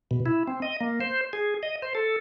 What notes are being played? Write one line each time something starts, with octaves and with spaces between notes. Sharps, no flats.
B2
E4
C4
D#5
A#3
C5
G#4
D#5
C5
A4